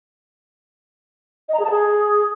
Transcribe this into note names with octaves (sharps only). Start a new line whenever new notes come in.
D#5
A#5
G#4
A5
G#4